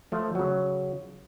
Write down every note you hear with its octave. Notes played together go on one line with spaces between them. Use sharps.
F3 A3
C#3 F#3